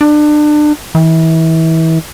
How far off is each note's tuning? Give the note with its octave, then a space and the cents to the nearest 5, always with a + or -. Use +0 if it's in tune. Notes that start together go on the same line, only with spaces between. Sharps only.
D4 +30
E3 -30